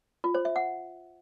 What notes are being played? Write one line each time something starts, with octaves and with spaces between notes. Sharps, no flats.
F4
C5
E5
F#5